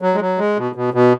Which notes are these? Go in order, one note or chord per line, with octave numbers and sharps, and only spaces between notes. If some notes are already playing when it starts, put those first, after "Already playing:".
F#3
G#3
F#3
G#3
B2
B2
B2